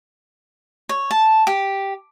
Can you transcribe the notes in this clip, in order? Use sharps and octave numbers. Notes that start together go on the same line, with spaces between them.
C#5
A5
G4